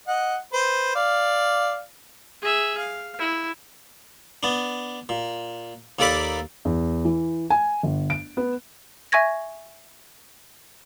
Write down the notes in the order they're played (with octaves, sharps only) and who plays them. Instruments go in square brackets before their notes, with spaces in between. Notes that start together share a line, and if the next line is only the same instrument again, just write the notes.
[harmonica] D#5 F#5
B4 C5
D5 F5
[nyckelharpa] G#4 E5
F5
E4
[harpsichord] B3 D4
A#2
D#2 A#3 A4 A#4 D5 B5
[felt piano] E2
E3
G#5
G1
D7
B3
[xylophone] E5 G#5 C#6 G#6 A#6